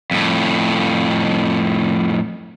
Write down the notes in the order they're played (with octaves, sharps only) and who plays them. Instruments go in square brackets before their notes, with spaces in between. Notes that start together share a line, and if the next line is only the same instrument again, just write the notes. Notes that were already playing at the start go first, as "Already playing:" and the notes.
[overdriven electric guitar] F2 A2